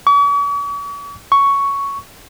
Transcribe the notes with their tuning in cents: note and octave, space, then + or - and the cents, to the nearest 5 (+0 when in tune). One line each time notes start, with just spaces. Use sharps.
C#6 +45
C#6 +5